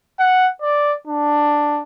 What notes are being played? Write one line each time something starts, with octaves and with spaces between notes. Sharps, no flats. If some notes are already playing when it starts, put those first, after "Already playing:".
F#5
D5
D4